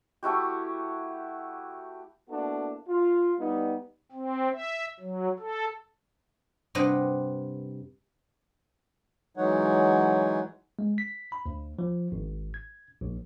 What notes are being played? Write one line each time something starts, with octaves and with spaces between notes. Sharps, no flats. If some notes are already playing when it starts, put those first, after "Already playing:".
A3 E4 F#4 G4
A#3 B3 D4 E4 F#4 A4
F4
G3 B3 D#4
C4
E5
F#3
A4
G2 C3 B4 C5 D#5 F#5
E3 F#3 G#3 D#4 C#5 F#5
G#3
B6
B5
D2
F3
G#1
G#6
A#1